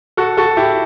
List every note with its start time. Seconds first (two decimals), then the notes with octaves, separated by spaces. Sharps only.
0.17 F#4 A4
0.37 F#4 A4
0.57 E4 G4